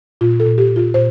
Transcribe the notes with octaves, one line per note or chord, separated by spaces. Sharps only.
A#2 F4
A4
A#2
G4
A#2
F4
A#2 C5